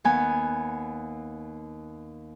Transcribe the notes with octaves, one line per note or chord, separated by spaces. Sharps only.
D#2 B3 G#5